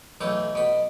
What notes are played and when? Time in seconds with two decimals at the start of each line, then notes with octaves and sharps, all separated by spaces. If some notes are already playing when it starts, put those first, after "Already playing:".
0.21 B1 E3 A3 C#6
0.55 B2 B5